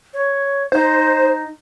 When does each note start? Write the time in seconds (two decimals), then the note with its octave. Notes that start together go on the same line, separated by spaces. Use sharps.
0.13 C#5
0.72 D#4 C5